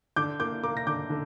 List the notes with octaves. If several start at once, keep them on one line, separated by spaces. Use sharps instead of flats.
D3 D6 G6
A#3 D6 G6
A#3 A#5 D6
A#6
D3 D6 G6
D3